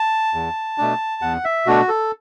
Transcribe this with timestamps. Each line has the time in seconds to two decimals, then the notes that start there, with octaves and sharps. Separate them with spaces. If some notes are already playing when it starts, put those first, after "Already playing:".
Already playing: A5
0.34 E2
0.78 B2 A3 D4
1.22 E2 F#5
1.45 E5
1.66 B2 A3 D4 F#4
1.88 A4